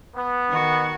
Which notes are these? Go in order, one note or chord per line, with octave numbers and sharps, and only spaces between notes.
B3
D#3 F#4